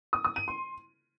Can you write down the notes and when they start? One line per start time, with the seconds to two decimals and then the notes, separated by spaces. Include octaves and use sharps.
0.13 D#6
0.25 D#6
0.36 D#7
0.48 C6